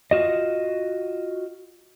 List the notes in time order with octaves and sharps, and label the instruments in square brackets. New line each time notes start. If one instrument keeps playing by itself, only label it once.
[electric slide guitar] F4 F#4 D#5